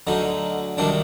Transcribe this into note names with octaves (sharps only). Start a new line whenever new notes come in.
D2 D3 F#3 D#4
C2 C3 D#3 F#3 D4